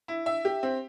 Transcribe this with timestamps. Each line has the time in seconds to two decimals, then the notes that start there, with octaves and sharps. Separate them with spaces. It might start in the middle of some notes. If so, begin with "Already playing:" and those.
0.08 E4
0.26 E5
0.45 G4
0.63 C4